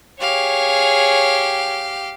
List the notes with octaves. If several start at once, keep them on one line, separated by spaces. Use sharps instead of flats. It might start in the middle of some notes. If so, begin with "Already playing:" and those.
G4 G#4 C#5 F5